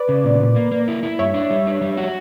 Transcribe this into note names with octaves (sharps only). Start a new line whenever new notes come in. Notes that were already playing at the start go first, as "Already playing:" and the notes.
Already playing: B4 D5
C#3
A#2
A#2
A#3
A#3
E4
E4
G2 C#5 E5
D4
G3
D4
G3
F#4